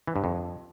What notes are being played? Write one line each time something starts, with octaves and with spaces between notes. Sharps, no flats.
E3
G2
F2